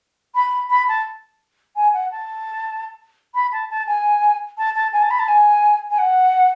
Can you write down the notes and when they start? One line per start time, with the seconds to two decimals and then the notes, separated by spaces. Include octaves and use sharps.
0.35 B5
0.70 B5
0.88 A5
1.75 G#5
1.93 F#5
2.10 A5
3.34 B5
3.52 A5
3.69 A5
3.87 G#5
4.57 A5
4.75 A5
4.92 G#5
5.01 A5
5.10 B5
5.19 A5
5.28 G#5
5.90 G#5
5.98 F#5